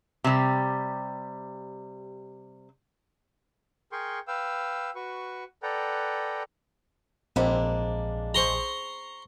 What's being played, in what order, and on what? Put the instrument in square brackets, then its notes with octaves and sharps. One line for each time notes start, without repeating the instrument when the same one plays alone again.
[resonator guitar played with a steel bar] C3 G3
[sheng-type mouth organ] G#4 A#4 G5 C6 C#6
B4 F5 G5 E6
F#4 B4 C#6
A4 B4 D5 F#5 G5 A#5
[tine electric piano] A#1 [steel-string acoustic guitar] G#3 A#3 D4 [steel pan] C4 B5
[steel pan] G#4 C5 [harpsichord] A#5 C6 C#6